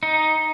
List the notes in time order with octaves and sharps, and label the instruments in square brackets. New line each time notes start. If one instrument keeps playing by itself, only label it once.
[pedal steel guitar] D#4